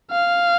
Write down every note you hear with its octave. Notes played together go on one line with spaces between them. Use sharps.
F5